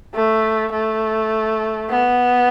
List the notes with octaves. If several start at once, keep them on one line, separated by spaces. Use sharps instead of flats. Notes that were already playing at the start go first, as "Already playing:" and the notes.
A3
A3
B3